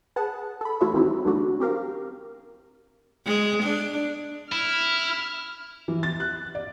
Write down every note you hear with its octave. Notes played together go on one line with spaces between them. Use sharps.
G#4 B4 F#5 A5
A4 B5
E3 A3 F4 F#4 C#5 E5
D#3 E3 G3 C4 D#4 E4
D3 E3 F#3 A3 D4 F#4
C4 G4 A#4 F5
G#3
D4
E4 F6
E3
A6
F#6
D5